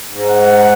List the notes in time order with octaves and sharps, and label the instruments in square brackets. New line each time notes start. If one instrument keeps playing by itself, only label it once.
[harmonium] G#2
[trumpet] F#5